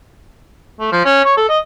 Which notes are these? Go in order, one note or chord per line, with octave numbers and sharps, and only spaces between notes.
A3
F3
C#4
C#5
A4
D#5